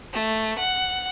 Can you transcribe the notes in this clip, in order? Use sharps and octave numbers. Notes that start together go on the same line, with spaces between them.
A3
F#5